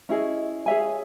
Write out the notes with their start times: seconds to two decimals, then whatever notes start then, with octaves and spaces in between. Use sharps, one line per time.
0.09 C#4 E4 G#4 D#5
0.66 G#4 C#5 E5 G#5